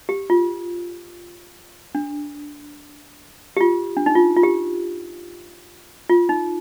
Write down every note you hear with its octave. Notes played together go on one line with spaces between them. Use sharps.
G4
F4
D4
G4
F4
D4
D#4
F4
F4
G4
F4
D#4